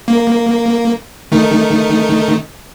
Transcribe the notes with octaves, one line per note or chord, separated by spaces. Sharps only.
A#3
D#3 A3 D#4